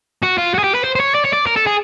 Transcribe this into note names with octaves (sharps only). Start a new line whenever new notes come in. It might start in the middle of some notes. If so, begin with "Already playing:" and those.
F#4
F4
F#4
G#4
G4
B4
C5
C5
C#5
D5
C#5
D5
A#4
A4
G#4